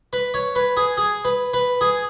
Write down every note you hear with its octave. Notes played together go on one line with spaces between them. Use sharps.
B4
C#5
B4
G#4
G#4
B4
B4
G#4